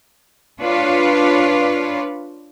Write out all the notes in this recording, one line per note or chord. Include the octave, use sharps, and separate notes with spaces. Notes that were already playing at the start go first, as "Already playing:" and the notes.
D4 F4 B4 C#5